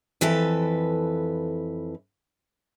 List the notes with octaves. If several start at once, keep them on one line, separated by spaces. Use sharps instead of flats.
F2 E3 A4 B4